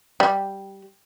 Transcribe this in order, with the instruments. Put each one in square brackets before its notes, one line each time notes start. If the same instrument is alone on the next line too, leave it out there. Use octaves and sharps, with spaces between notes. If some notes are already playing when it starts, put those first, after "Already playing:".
[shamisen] G3